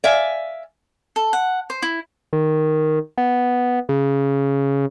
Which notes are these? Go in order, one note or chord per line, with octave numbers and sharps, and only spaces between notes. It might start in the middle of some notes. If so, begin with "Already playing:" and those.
D5 E5 F5 G#5
A4
F#5
C5
E4
D#3
B3
C#3